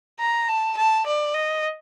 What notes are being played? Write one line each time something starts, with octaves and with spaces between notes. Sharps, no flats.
A#5
A5
A5
D5
D#5